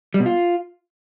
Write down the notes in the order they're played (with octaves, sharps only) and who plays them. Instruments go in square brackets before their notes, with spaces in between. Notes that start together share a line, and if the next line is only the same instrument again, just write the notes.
[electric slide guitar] G3
B2
F4